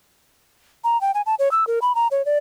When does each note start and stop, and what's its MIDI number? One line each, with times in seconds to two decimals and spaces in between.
0.84 1.00 82
1.01 1.11 79
1.14 1.22 80
1.26 1.35 81
1.39 1.51 73
1.51 1.67 88
1.67 1.79 70
1.82 1.95 83
1.95 2.08 82
2.11 2.24 73
2.25 2.38 74